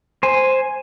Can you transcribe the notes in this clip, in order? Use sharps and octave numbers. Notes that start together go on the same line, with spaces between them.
C5 G#5